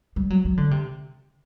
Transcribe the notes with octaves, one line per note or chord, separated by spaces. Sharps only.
G3
F#3
F#3
D3
C3